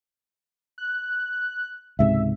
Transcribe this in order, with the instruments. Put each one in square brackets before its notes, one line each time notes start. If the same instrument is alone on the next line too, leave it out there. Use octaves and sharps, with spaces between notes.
[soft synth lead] F#6
[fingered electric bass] C#2 G#2 C3 [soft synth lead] E5